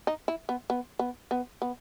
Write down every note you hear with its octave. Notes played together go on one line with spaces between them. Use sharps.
D#4
E4
B3
B3
B3
B3
B3